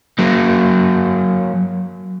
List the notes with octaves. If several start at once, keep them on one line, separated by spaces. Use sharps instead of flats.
F#3 A#3